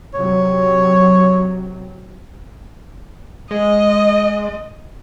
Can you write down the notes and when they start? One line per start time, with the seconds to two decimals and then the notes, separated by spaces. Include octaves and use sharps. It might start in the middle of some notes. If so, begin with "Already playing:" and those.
0.14 C3 F#3 C#5
3.51 G#3 D#5